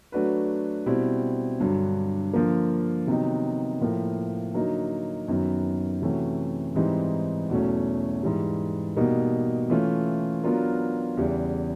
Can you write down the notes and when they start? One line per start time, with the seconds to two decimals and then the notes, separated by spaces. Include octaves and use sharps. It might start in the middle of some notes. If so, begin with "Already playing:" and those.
0.12 F#3 A3 D4 F#4 B4
0.86 B2 G3 C4 E4
1.60 G2 D3 F#3
2.33 D3 F3 A#3
3.07 C3 D#3 F#3 B3 D#4
3.81 A2 F3 A#3
4.54 D3 F#3 A#3 D#4
5.28 F#2 D#3 F#3 B3
6.02 C3 E3 A3 C#4 F#4
6.75 G#2 E3 G3 C4 D#4
7.50 E2 B2 F#3 A3 C#4
8.22 G#2 E3 G3
8.96 B2 G3 A#3 D#4
9.70 E3 A3 C#4 F4
10.43 F#3 B3 D4 F4 A#4
11.17 E2 C#3 E3 G3